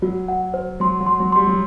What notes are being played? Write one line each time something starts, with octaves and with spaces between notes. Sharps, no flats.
F#3 F#4
F#5
C5
F#3 C6
F#3
C6
F#3
G3 C6
F#3